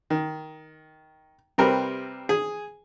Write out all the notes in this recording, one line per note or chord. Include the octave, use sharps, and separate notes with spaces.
D#3
C3 G3 C4 A#4 B4
G#4